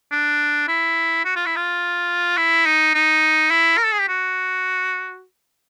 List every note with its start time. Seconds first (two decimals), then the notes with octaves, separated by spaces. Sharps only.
0.12 D4
0.68 E4
1.25 F#4
1.35 F4
1.46 E4
1.56 F4
2.37 E4
2.66 D#4
2.94 D#4
3.50 E4
3.77 A#4
3.85 A4
3.93 G#4
4.00 G4
4.08 F#4